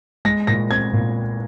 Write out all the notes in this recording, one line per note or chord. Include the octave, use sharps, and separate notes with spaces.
G#3 A#6
A#2 A#6
C4 G#6
A#2